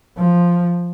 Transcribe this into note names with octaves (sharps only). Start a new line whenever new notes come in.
F3